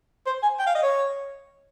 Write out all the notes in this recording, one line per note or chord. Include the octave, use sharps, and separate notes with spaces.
C5
G#5
G5
F5
D#5
C#5